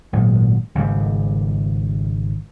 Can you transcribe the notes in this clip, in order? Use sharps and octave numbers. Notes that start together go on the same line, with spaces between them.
G#1 A#2 F#3 G#3
G#1 G#2 C#3 G3